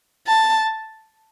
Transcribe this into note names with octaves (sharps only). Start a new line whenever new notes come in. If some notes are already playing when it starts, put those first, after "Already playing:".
A5